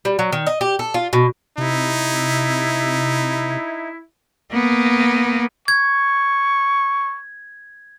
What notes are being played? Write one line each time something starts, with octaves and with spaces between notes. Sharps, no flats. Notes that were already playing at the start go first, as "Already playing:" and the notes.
G3
F#3
D#3
D#5
G4
A4
F4
B2
C3 D#4 E4
A#3 B3
C#6 G#6